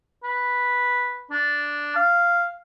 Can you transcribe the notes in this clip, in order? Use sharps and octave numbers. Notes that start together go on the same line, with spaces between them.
B4
D4
F5